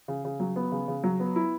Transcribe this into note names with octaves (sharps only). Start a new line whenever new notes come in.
C#3
C#3
F#3
B3
C#3
C#3
F#3
B3
E4